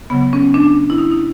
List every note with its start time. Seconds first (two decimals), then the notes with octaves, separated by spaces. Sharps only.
0.10 C#3 F#3 B3
0.33 C#4
0.54 D4
0.90 E4
0.98 D#4
1.11 D#4